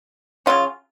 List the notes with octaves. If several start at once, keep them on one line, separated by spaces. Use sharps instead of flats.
C#3 F#3 C#4 F4